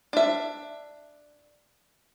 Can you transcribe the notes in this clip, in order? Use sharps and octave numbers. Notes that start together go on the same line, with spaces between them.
D4 E5